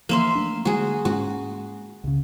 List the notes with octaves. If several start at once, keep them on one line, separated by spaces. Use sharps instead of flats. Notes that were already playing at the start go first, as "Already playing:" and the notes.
E3 F3 A#3 E5 C6
A3 D4
D3 G3 G#3 F#4 G#4
G#2 G#3 C#4 F#4
C#2 C#3